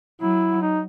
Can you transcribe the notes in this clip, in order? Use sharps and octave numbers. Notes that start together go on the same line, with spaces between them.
F#3 E4
D#4